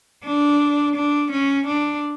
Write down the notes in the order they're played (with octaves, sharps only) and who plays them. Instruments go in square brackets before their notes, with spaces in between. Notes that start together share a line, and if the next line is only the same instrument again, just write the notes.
[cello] D4
D4
C#4
D4